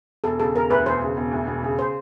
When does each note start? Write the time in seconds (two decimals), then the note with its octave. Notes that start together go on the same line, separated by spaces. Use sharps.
0.24 E1 A4
0.40 C#3 A4
0.54 E1 A#4
0.70 D2 B4
0.86 E1 C5
1.02 C#3
1.17 E1
1.31 D2
1.47 E1
1.63 C#3
1.79 C5